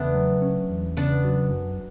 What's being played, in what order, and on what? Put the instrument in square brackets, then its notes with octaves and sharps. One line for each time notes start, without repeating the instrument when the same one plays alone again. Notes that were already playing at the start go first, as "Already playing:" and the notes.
Already playing: [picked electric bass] E2 C#3 [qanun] A3 B3 D4
[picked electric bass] F#3
C#4
E2
[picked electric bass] C#3 [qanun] B3 D4
[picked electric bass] F#3
F#2